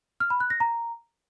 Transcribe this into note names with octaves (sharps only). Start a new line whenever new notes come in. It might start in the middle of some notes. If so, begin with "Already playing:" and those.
F6
B5
F#6
A#6
A#5